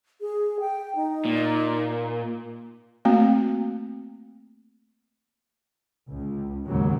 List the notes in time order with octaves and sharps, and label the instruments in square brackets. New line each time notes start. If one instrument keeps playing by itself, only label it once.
[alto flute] G#4
G5
D#4
[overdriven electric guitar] A#2
[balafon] A3 A#3 C4 F#4
[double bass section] C#2
D#2 G#2 C#3 F#3